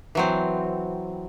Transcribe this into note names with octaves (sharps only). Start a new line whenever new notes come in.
E3 F#3 C4